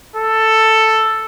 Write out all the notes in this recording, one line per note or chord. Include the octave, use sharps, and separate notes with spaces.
A4